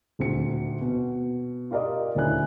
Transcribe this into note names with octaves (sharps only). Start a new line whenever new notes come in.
D#1 D2 C4 C#7
B2
F4 G4 A#4 D5 D#5
D#1 D2 C#4 E4 G#5 F#6